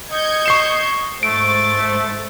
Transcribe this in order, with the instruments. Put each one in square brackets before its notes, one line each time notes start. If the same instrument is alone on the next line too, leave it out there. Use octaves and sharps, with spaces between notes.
[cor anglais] D#5 [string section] G6 G#6 C#7
[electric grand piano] C#6 C7 E7
[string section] G#2 C5 A6 [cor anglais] A3 [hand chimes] D7